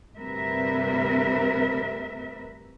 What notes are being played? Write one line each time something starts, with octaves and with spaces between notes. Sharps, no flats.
D2 G2 C3 A#4 B4 E5